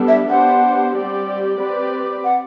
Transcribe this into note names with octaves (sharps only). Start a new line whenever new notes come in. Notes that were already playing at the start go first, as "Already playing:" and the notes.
Already playing: G3 B3 D4 A4
E5
B3 D4 G4 C5 F#5
G3 C4 G4 D5
C4 G4 B4 D5
F#5